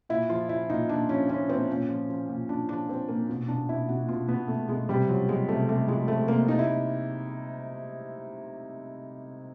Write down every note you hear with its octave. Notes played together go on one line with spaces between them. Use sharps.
A#2 E4
F3 F4
F3 E4
A#2 D#4
A#2 D4
F3 C#4
F3 C#4
A#2 C4
A#2 C#4
F3
F3
A#2
A#2 D4
F3 D4
F3 C4
A#2 A#3
B2
B2 D4
B2 E4
B2 F#4
B2 F4
B2 B3
B2 A3
B2 G#3
C3 G3
F3 F#3
F3 G#3
C3 A3
C3 A3
F3 G#3
F3 A3
C3 A#3
C3 D#4
E4